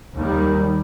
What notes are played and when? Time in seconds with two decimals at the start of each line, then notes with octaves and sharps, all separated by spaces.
0.18 D#2 D#3 G3